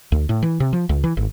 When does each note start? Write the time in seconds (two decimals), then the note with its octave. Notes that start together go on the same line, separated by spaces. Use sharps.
0.12 D2
0.29 A2
0.43 E3
0.60 C3
0.73 F3
0.89 C#2
1.04 E3
1.17 G#1